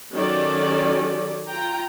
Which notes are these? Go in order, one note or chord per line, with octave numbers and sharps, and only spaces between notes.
D#3 F#3 C#4 G4 A4 D5
F4 G5 A#5